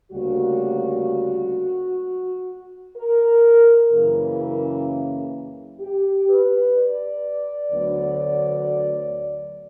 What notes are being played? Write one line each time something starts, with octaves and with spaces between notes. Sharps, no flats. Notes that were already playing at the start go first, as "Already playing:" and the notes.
D2 C#3 G3 A#3 F#4
A#4
F#2 C#3 E3 A#3
G4
B4
D5
D2 D3 F#3 B3